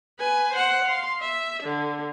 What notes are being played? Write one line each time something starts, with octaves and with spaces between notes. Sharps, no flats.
B4 G#5
C5 F#5
F5 C6
E5
D3